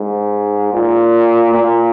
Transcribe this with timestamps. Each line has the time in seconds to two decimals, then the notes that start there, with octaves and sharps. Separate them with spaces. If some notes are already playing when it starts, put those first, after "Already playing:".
Already playing: G#2
0.73 A#2
1.54 A#2